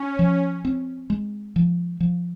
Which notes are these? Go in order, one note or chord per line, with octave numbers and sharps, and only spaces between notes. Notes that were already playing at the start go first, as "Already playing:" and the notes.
Already playing: C#4
F3
C4
G#3
F3
F3